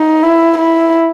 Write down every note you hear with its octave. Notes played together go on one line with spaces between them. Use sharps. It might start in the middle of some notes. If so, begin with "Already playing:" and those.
Already playing: D#4
E4
E4